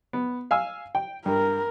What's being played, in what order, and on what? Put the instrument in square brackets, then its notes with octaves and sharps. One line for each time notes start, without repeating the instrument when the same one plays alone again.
[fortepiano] B3
F5 G#5 E6
G5
[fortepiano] G2 [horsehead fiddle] A#4